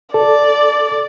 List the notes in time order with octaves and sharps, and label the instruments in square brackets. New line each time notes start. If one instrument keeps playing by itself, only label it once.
[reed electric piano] A4 [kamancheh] D5